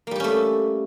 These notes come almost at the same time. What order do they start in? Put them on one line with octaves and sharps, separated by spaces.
A#3 G3 G4 C#4 A3